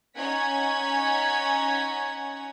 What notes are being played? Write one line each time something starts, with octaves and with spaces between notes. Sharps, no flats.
C#4 D#4 C#5 F#5 G#6 B6